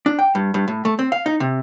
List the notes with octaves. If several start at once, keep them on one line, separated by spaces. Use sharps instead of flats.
D4
G5
G2
G2
A2
A3
C4
F5
D#4
C3